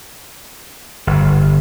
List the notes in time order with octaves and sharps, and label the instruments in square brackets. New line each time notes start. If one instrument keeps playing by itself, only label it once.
[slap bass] G1